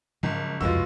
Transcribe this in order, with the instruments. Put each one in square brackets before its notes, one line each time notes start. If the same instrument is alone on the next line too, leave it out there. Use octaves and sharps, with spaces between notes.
[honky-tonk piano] G#1 [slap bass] C#3 F3 F#3
[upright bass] C2 F2 [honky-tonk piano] G#3 F#4 [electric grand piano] F4 B4 E6